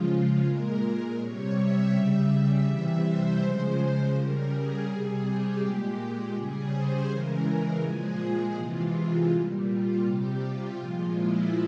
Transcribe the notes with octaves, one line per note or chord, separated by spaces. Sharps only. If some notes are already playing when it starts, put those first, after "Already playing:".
Already playing: C#3 F3 G#3 F4
A#2 G#3 A#4
C3 G3 C#5
E5
C#3 G3
E5
C3 E3 G3 E5
C5
C#3 F3 G#3
C#3 G3 A#4
G#4
C3 G3
G4
A#2 G#3
C#3 G3 G#4
C5
C#3 E3 G#3 A#4
A#2 F3 G#3 G#4
C3 E3 G#3 F4
A#2 G3
F4
C3 G3 G4
F4
A#2 F3 G#3
E4